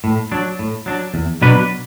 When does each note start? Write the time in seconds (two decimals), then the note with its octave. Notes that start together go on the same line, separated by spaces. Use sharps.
0.04 A2
0.32 F#3 D4
0.59 A2
0.86 F#3 D4
1.14 E2
1.42 B2 F#3 D4 B4